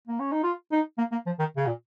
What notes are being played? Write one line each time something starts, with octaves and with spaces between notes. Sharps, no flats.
A#3
C#4
D#4
F4
D#4
A#3
A#3
F3
D#3
C#3
A#2